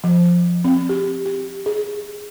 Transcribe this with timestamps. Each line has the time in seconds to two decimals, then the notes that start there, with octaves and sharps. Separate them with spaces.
0.04 F3
0.64 C4
0.89 G4
1.26 G4
1.66 G#4